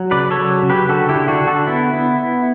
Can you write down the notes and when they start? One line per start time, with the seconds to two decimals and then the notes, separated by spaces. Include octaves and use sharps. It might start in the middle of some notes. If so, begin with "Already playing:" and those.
Already playing: F#3
0.11 C#3 B4 D5
0.31 A4 C#5
0.37 F#3
0.63 C#3
0.70 G4 B4
0.89 D3 F#4 A4
1.09 E4 G4
1.15 D3
1.28 D4 F#4
1.42 D3
1.47 F#4 A4
1.67 B3 E4
1.94 B3